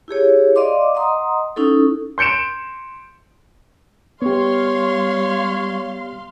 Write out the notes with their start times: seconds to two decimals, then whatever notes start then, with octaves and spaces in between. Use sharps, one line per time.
0.08 E4 G4 G#4 C#5
0.56 D5 D#5 F5 C6 D6
0.95 D#5 F#5 A#5 C6 D#6
1.56 C#4 D#4 E4 A4
2.18 C6 G6 C#7 D7 E7
4.22 G3 B3 G4 C#5 F5 C6